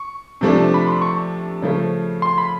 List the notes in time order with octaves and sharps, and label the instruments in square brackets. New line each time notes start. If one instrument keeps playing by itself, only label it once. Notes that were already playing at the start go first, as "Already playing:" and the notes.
Already playing: [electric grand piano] C#6
[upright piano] C3 F3 A3 D4
[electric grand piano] B5
C6
C#6
[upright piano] C#3 F3 A3
[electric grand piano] C6
B5